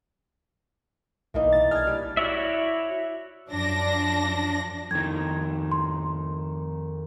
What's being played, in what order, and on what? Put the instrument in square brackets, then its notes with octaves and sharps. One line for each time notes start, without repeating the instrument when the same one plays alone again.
[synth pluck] B1 [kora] E3 A#3 D#4
[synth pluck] C2 A6
[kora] D4 G#4 [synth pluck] F6 G#6
[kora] G3 [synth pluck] E4
[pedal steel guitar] E4 F#4 C#5 D5 E5
[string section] F#2 F3 D4 A#6
[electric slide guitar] F2 D#3 [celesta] G#6
[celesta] C6